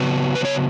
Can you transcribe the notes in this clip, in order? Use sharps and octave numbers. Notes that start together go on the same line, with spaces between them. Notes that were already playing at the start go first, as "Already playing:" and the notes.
Already playing: C#3 F#3 B3
B4
C#5